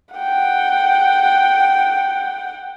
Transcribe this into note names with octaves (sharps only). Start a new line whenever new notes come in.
F#5 G5